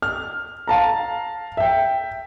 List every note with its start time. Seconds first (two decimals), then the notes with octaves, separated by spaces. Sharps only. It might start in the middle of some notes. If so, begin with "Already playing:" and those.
0.02 F6
0.68 F5 A5 A#5
1.57 E5 G5